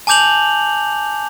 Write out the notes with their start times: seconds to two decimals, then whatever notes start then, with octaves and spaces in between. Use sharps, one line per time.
0.07 G#5 A5 D6 G6 F7 F#7